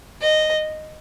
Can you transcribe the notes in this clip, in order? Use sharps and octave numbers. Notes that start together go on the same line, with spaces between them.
D#5